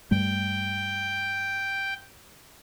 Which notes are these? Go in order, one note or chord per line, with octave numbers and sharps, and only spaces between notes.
G2 G3 A3 G5